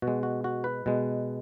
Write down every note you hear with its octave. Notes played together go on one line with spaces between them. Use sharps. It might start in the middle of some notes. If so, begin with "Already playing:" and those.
B2 F#4
G#3
F#4
F#4
B4
B2 G#3